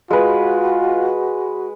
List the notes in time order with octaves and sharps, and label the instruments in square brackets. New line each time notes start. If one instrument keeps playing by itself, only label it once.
[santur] G#3 B4 [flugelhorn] F4 [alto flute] F#4